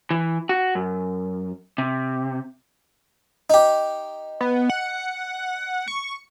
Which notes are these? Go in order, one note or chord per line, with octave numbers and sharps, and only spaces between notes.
E3
F#4
F#2
C3
D#4 G4
B3
F#5
C#6